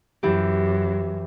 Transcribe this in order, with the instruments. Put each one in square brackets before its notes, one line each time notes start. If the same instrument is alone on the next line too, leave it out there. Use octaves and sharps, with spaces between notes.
[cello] F#2 [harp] E3 E4 G4